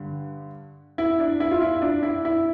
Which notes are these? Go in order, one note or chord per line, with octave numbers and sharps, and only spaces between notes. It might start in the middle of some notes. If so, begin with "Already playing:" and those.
Already playing: G2 D3
E4
D4
E4
F4
E4
D4
E4
E4